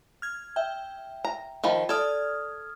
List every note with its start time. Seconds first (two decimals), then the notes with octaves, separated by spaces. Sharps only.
0.22 F6 G#6
0.56 E5 G5
1.25 A#5
1.64 D#3 F3 B5
1.89 A4 D5 D#6 F6 G#6